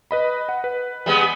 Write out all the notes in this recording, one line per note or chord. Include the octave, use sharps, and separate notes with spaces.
B4 D#5 B5
F#5
B4
G3 G#3 B3